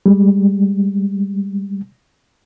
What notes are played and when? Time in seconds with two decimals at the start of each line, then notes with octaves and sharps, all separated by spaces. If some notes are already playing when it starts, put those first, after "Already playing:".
0.06 G3 G#3